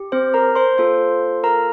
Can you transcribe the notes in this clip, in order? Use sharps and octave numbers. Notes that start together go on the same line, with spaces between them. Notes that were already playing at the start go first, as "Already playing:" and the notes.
Already playing: G4
C4 C5
A#4 A#5
C5 C6
A#3 F4 A4 C5 C6
A#4 A#5